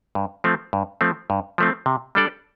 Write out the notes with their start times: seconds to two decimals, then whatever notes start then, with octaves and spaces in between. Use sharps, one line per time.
0.15 G2
0.44 F3 A3 C4
0.73 G2
1.01 F3 A3 C4
1.30 G2
1.58 F3 A3 C4
1.86 C3
2.15 G3 D4 A4 D5